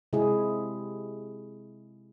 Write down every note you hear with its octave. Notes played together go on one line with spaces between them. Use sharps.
C3 G#3 E4 G#4